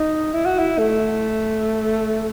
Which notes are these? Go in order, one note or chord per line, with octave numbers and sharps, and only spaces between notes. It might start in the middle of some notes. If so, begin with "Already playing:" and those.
Already playing: D#4
E4
F#4
E4
A3